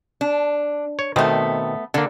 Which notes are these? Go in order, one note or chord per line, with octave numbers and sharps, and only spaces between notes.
D4
C#5
B2 D#3 A3 B3 C4
D3 A#3 A4